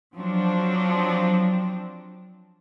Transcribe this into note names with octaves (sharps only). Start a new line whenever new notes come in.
F3 F#3 C4 D4